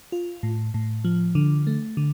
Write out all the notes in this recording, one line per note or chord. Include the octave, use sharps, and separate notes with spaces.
F4
A2
A2
F3
D3
A3
D3